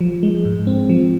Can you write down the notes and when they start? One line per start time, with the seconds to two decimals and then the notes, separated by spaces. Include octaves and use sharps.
0.01 F3
0.23 G#3
0.45 G#2
0.67 C4
0.89 F3